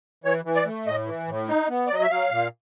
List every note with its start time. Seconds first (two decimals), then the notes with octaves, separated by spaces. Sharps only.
0.24 E3 C#5
0.45 E3
0.55 D5
0.66 A3
0.86 A2 D#5
1.06 E3
1.28 A2
1.48 D#4
1.69 B3
1.87 D5
1.90 F#3 D#5
2.03 E5
2.10 F#3 F5
2.31 A#2